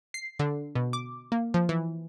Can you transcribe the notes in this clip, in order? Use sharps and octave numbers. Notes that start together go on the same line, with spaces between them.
C7
D3
B2
D6
A#3
F3
E3